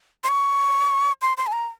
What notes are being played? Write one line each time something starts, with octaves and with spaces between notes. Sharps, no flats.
C6
C#6
C6
C6
G#5
A#5